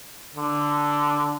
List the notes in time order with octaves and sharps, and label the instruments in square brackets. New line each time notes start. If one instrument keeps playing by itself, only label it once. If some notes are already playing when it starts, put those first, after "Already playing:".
[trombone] D3